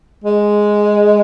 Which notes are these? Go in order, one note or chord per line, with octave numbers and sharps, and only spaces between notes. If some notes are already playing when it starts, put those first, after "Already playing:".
G#3